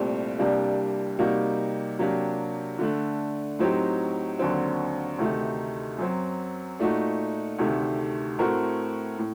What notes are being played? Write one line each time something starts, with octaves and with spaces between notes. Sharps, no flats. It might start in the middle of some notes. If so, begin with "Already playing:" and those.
Already playing: C2 A#2 A3 C4 G4
C2 C3 G3 A#3 D4
C3 G3 A#3 D#4 F#4
C3 F#3 A#3 D4 G4
D3 A3 D4
A2 F#3 C4 D#4 G4
D#2 D3 F#3 C4
D2 C3 D#3 A3 D#4
F#2 F#3 C4
A#2 A3 D#4 F#4
D2 C3 D#3 A3
A2 A3 C4 F#4 A#4
A2